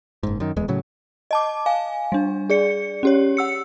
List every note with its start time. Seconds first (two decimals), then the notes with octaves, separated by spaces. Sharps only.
0.23 F#1 G#2
0.40 F#2 D#3
0.56 D1 E2 G#3
0.68 A2 C#3 F#3
1.31 D#5 A5 D6
1.66 F5 G#5
2.12 G3 D4
2.50 G#4 D5 C#7
3.03 C#4 G4 C#5
3.37 F#5 E6 C#7